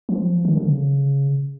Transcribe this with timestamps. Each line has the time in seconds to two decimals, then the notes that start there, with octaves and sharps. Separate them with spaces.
0.09 F3
0.45 D#3
0.57 D3
0.69 C#3